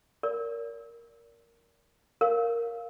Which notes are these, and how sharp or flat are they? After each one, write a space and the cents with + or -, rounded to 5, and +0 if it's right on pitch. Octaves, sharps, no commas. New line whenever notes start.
A#4 +0 D5 -40
A#4 +0 C#5 +0 F5 +0